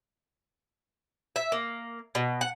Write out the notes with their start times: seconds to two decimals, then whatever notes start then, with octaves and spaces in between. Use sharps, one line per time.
1.36 E5
1.52 A#3
2.15 B2
2.41 F#5